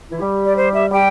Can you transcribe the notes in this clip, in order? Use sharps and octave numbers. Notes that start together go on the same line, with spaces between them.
E3 E4
G3 G4
D5
C5
E5
G3 G4 G5